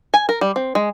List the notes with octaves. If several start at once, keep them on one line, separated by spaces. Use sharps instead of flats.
G#5
A#4
G3
C4
G#3